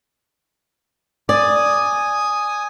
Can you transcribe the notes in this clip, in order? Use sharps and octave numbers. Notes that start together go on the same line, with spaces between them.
D5 G#5 D#6